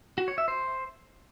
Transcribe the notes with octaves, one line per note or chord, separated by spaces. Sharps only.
F#4
C#5
E5
C5